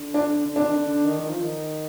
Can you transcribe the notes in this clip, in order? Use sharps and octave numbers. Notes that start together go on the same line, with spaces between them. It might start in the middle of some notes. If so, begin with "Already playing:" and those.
Already playing: D3
D4
D3
C3 D4
D#3
D3
D3
D#3
D#3
F3
D#3